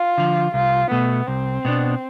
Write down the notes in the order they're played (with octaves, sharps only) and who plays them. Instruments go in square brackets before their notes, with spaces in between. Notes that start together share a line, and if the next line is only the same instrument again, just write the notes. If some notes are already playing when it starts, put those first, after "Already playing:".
Already playing: [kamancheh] F4
[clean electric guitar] D3 F3
[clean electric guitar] C2 [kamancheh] F4
[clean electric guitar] B2 A3 [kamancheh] B3
[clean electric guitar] C2 [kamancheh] C4
[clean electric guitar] B2 B3 D4